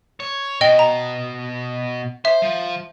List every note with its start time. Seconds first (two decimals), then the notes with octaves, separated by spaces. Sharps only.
0.20 C#5
0.61 B2 D#5 G5 G7
0.79 A#5
2.25 C5 E5
2.42 F3